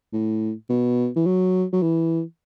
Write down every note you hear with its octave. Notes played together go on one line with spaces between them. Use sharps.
A2
B2
E3
F#3
F#3
E3